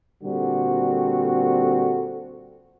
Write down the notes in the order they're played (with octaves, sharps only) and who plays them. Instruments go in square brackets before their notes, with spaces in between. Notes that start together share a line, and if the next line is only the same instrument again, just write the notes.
[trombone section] A#2 D3 G3 C4 F#4 A4